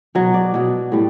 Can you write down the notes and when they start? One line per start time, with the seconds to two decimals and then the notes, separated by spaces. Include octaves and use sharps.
0.15 B2 F#3
0.34 D5
0.54 B2 F#3
0.92 A2 G3